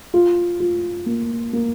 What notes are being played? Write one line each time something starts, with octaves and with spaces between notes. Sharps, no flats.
F4
F4
A#3
A#3